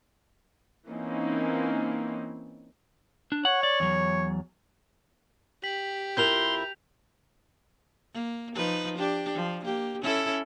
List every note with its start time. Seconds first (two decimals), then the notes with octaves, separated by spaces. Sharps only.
0.89 E3 A#3 C4 C#4 D#4
3.32 D4
3.45 C#5 F#5
3.63 D5
3.80 E2 F#3
5.64 G4 B6 F#7
6.17 F2 E4 A#4 C6 G6 F7
8.14 A#3
8.55 F3 D#4 B4
8.97 D4 G4
9.34 F3
9.64 A#3 G4
10.02 C#4 E4 A4